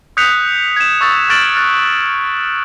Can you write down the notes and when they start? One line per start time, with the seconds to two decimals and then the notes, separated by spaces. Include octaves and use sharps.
0.17 D#6 F#6 G6 B6 C#7 F7
0.76 G#6 E7
1.01 C#6 D#6 E6 G6 A6
1.29 C#6 F6 F#6 A6 D7 F#7
1.56 F6 F#6 A6